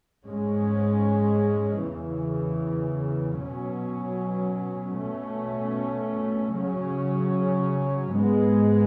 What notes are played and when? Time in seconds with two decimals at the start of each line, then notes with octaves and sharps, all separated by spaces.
0.25 G#2 G#3 C#4
1.82 E2 C#3 E3
3.40 B2 F#3 C#4
4.97 B2 A3 C#4
6.55 C#3 F#3 C#4
8.13 G#2 G#3 B3